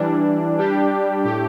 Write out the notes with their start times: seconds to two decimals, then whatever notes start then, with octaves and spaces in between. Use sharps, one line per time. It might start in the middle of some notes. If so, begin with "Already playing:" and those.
Already playing: E3 G3 D4
0.58 G3 D4 G4
1.24 A2 A3 G4